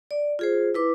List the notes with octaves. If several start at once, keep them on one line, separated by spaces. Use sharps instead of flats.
D5
F4 G#4 C5
E4 B4 D6